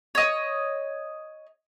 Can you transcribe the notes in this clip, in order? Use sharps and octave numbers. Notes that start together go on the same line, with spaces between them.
C#5 D#5